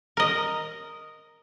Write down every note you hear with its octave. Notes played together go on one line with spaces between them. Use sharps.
A#4 D#5